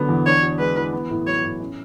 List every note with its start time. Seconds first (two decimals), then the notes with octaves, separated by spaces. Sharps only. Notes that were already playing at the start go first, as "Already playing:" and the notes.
Already playing: D3 F#3 B3
0.09 E2
0.26 D4 C#5
0.43 F#4
0.59 G#3 B4
0.76 E3
0.93 B3
1.10 A2
1.26 F#3 C#5
1.43 A2
1.60 C#4